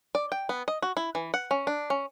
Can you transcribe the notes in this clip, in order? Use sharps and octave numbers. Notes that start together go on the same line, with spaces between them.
D5
G5
B3
D#5
F#4
E4
E3
F#5
C#4
D4
C#4